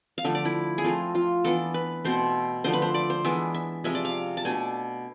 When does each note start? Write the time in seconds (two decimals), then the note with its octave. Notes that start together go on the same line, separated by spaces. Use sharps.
0.18 F5
0.24 D3 F3 A3 E5
0.35 D5
0.45 E4
0.78 G#4
0.84 F3 A3 C4 F4
1.15 F4
1.45 E3 B3 D4 A4
1.74 B4
2.05 B2 A3 C4 C5
2.64 D3 F3 A3 C5
2.73 B4
2.82 C5
2.94 D5
3.10 C5
3.25 E3 G#3 B3 D4 E5
3.55 E5
3.84 C3 F3 G#3 E5
3.95 D5
4.05 F5
4.37 A5
4.45 B2 A3 D4 G#5